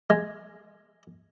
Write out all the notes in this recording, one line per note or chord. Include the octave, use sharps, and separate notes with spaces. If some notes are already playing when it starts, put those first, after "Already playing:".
G#3